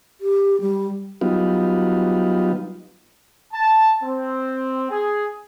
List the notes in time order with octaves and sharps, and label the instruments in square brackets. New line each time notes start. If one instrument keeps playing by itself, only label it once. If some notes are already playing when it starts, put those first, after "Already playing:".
[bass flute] G4
G3
[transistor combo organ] F#3 G3 B3 D#4 F4
[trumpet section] A5
C4
G#4